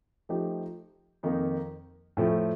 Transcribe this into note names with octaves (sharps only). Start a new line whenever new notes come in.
F3 A3 D#4 G4
F2 D#3 A#3 D#4
A2 F3 A3